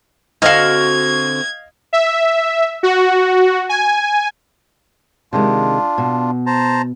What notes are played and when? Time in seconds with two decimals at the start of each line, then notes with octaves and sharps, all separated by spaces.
0.42 D3 C4 F#4 D#5 F5 F6 G#6
1.93 E5
2.83 F#4
3.69 G#5
5.33 C3 D#3 G#3 D4 F4
5.98 B2
6.46 C5 A5 A#5